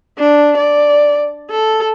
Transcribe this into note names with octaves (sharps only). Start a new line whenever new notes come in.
D4
D5
A4